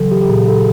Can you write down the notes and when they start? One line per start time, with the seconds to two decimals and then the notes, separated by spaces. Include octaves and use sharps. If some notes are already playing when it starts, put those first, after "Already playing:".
Already playing: C#3 E3 F#3 A4
0.11 G4
0.22 G4
0.29 A#2 G#4
0.48 A4